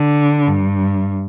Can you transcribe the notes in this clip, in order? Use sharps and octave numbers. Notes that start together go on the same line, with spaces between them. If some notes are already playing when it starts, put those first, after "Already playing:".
Already playing: D3
G2